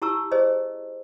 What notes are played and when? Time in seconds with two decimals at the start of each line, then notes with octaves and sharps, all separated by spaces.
0.02 E4 G4 A5 A#5 C#6 E6
0.32 G#4 C5 D#5